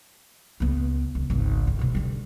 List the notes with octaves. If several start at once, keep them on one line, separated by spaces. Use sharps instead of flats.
C#2 B3
C#2
G#1 C#2
D3
E1 B2
D3 G3